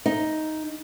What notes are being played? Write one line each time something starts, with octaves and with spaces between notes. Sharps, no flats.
D#4